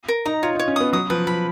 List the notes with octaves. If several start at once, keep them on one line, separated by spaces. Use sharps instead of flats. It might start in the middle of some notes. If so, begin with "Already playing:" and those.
A#4
D#4 A#5
F4 C#5
D#4
C#5
C#4
B3 D#6
F#3 D#6
F3 B4
F3 B5